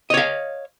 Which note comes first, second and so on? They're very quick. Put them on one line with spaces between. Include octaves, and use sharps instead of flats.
D#5 C#5 F5